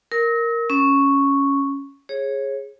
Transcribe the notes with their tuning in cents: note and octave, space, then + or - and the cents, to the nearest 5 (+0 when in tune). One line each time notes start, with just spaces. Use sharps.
A#4 +0 E6 -45
C#4 +0 C#6 +0
G#4 +0 C#5 -25